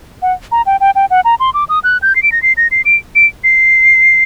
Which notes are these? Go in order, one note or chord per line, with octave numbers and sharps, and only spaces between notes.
F#5
A#5
G5
G5
G5
F#5
A#5
C6
D6
D#6
F#6
G6
C7
D7
A#6
C7
A#6
C7
D7
D7
C7